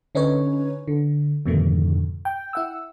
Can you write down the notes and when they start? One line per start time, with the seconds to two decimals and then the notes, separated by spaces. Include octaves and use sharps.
0.15 D3 C#4 D#4 B4 C#5
0.88 D3
1.46 F2 G#2 B2 D3 D#3 A3
2.25 G5
2.53 E4 F#5 E6